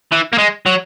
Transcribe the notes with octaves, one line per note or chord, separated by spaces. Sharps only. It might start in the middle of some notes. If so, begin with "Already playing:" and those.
E3
A#3
G#3
F#3